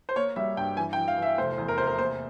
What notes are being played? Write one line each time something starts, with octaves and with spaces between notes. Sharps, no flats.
C5
A#3 C#5
G3 E5
G2 G5
E3 G#5
G5
E3
F5
E3 E5
F1 C5
E2
A#4
C3 C5
A#4
A#3 C5